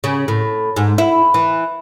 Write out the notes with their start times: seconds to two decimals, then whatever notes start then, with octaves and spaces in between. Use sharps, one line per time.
0.04 C#3
0.28 A2
0.76 G#2
0.98 E4
1.34 E3